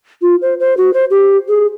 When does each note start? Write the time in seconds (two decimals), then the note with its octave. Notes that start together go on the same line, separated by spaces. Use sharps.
0.22 F4
0.42 C5
0.60 C5
0.77 F#4
0.93 C5
1.10 G4
1.48 G#4